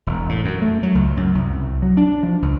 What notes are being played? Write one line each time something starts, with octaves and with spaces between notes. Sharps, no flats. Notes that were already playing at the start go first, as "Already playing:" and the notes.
E1
A2
F#2
A3
F#3
C#2
F#2
C2
F#3
D4
F3
C#2